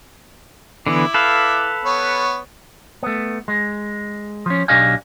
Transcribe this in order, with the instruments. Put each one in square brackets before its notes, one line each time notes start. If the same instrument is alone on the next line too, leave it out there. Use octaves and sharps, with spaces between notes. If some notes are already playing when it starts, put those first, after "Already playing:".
[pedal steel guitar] D3 E3 B3 [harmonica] E4 D6
[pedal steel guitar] A4 B4 F5
[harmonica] B3 C#5
[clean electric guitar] A3 B3
G#3
F3 C#4
B1 D4 G4 D#5 F5 G#5